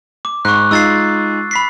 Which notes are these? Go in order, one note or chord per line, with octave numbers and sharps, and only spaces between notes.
D6
G#2 C#6 F#6
G#3 D#4 F4 E6 A6 C7
B5 B6 C7